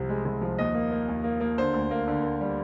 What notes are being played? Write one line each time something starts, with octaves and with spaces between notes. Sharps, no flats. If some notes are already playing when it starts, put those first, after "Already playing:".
Already playing: C2 C3 F3
G#3
C2
F3
D#2 D#5
A#3
A#3
D#2
A#3
A#3
D3 C5
D2
A#3
D3
A#3
G3